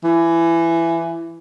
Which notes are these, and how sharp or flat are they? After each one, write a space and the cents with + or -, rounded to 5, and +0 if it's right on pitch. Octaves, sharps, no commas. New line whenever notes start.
E3 +20